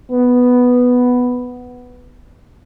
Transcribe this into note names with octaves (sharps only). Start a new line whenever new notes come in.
B3